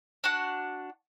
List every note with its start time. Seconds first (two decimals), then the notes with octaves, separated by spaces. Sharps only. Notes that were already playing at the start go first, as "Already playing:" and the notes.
0.24 D4 F#4 F#5